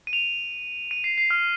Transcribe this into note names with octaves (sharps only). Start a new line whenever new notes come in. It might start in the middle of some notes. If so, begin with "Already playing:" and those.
D#7
F7
D#7
C7
C7
F6